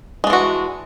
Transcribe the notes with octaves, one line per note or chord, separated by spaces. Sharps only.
E3 G#3 D4 F#4